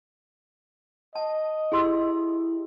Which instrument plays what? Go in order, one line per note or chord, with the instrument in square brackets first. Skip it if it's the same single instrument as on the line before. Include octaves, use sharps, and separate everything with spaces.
[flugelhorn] D#5 [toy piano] A5
[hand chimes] E4 G4 [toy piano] G#4 C6 E6